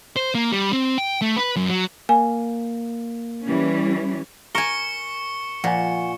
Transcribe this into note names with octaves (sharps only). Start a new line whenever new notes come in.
C5
A#3
G3
C4
G5
A3
B4
F#2
F#3
A#3 G#5
E3 G3 C#4
A#4 G#5 C#6 C#7 G7
A#2 F3 F#5 G#5